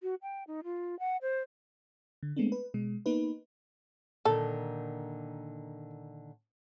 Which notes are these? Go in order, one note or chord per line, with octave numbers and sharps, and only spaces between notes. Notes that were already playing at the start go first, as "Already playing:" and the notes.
F#4
G5
D#4
F4
F#5
C5
D3
G#3 A3 B3 C4 D4
B4
B2 G#3
A#3 B3 D#4 B4
A#2 D3 D#3 A4